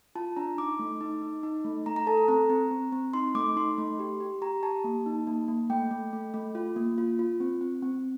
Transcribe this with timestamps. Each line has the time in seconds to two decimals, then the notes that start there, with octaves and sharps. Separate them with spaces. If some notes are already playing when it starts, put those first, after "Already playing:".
0.15 F4 A5
0.36 D4 A#5
0.58 D#4 D6
0.79 A3
1.01 D#4
1.22 D#4
1.43 D#4
1.64 A3
1.86 A3 A#5
1.96 A#5
2.07 A4 A5
2.18 A#5
2.28 C4 A#5
2.50 C4
2.71 C4
2.92 C4
3.14 D#4 C6
3.35 A3 D6
3.56 D#4 C6
3.78 A3
3.99 G4
4.20 G4
4.42 G4 A#5
4.63 G4 A5
4.84 A#3
5.06 D#4
5.27 A#3
5.48 A#3
5.70 A3 G5
5.91 A3
6.13 A3
6.34 A3
6.55 F4
6.76 A#3
6.98 F4
7.19 F4
7.40 C4
7.61 C4
7.83 C4